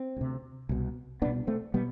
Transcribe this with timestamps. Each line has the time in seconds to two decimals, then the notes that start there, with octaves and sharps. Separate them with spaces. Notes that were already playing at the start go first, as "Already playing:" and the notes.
Already playing: C4
0.17 D2 C3
0.69 C2 B2
1.22 C2 B3 D4
1.26 B2
1.47 A3 C4
1.74 B2 G3 B3